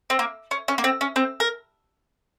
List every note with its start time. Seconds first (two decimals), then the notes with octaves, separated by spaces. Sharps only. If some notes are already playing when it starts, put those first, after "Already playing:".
0.10 C4
0.19 A#3
0.51 C#4
0.68 C#4
0.78 A#3
0.84 C4
1.01 C#4
1.16 C4
1.40 A#4